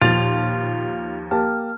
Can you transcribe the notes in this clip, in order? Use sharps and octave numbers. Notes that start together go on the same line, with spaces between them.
D#2 A#2 F3 F4 A6 F7
A#3 G4 A5 F6